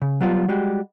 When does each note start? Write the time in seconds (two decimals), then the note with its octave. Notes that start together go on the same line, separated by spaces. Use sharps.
0.02 C#3
0.21 F#3 G3 B3 F4
0.49 G3 G#3 F#4 G4